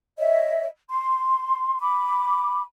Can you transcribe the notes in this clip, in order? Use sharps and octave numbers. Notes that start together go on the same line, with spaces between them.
C#5 D#5 E5
C6
B5 D6